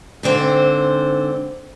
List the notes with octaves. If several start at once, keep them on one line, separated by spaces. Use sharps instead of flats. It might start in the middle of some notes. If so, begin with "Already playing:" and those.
G#2 D3 C4 C5